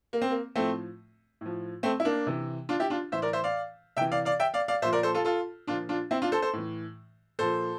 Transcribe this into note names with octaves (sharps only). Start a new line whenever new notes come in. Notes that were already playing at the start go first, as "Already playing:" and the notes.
A#3
C4
A#3
A2 F3 A3 C4
A2 F3
A3 C4
E4
A#3 D4
C3 E3
D4 F4
E4 G4
D4 F4
A2 E3 C5 E5
A#4 D5
C5 E5
D5 F5
C3 E3 E5 G5
D5 F5
D5 F5
E5 G5
D5 F5
D5 F5
A#2 F3 C5 E5
A#4 D5
A4 C5
F4 A4
F4 A4
A#2 F3 D4 F4
D4 F4
C4 E4
D4 F4
A4 C5
A4 C5
A2 E3
A#2 F3 A4 C5